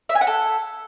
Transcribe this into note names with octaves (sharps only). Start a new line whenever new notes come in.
E5
G#5
F#5
A4